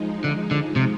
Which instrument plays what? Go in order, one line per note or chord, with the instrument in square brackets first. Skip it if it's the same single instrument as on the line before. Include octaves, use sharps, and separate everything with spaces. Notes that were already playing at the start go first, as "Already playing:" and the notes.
Already playing: [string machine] F3 G#3 D#4
[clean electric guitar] D3
D3
C3